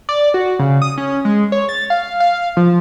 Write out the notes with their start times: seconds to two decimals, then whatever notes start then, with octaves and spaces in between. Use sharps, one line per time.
0.09 D5
0.34 F#4
0.59 C#3
0.82 D#6
0.98 C#4
1.25 G#3
1.52 C#5
1.69 A6
1.90 F5
2.20 F5
2.57 F3